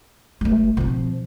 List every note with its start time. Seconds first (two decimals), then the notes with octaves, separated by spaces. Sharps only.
0.41 G1 G#3 A3
0.77 B2 F3 C4